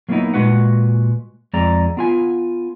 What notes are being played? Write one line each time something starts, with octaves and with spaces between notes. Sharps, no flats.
F#3 A#3 B3 C#4 D#4 E4
A#2 G#3 F#4 B4 F#5
F2 G#3 C4 D5 A#5
B3 F4 G#5